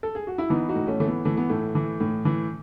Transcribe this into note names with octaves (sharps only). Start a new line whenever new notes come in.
A4
G#4
F#4
E4
E3 B3 D#4
D#4 F#4
A2
A3 C#4
E3 A3
B3
E3 A3
B3
A2 A3
E3
A2
E3